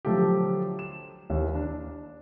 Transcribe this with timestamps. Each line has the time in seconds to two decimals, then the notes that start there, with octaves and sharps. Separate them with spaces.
0.05 D3 F3 F#3 A3 F4 G4
0.79 E7
1.30 D#2 E3
1.55 D4